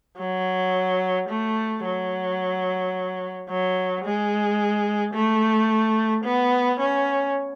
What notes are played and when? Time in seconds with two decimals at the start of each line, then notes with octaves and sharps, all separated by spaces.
0.19 F#3
1.29 A3
1.85 F#3
3.49 F#3
4.04 G#3
5.14 A3
6.24 B3
6.80 C#4